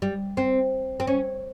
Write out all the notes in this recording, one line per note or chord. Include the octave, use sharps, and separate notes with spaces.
G3
C4
C4
C#4